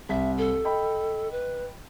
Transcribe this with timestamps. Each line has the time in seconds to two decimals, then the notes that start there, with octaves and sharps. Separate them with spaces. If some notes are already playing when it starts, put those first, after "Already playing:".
0.09 C2 E5 B6
0.38 A4
0.64 D#5 G5 B5
1.32 B4